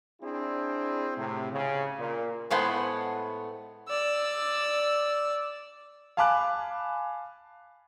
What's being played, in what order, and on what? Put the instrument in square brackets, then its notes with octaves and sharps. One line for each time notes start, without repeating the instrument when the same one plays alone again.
[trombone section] C4 D4 E4 G#4
A2 C3
C#3
A#2
[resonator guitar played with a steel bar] A2 G#3 A3 B3 C5 F#5
[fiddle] D5 E6
[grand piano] F5 G#5 A5 B5 D6 F#6